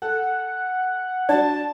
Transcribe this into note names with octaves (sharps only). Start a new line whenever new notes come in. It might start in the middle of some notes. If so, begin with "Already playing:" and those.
A4 F#5
D4 F#4 D5 A5